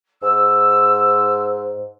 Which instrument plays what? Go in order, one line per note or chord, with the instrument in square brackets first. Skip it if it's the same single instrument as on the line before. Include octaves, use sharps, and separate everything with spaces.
[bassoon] G#2 [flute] E6